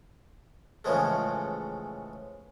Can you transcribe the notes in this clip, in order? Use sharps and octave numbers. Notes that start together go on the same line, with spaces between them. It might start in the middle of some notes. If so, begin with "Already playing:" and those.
A2 C#3 E3 F3 G#3 A3